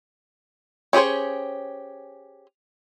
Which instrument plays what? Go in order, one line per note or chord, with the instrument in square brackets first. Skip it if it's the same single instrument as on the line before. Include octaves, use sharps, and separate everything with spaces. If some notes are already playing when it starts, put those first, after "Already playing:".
[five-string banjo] C#4 G4 G#4 C5 C#5